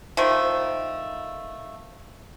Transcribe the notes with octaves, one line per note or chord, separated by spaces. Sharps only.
D#3 F3 A3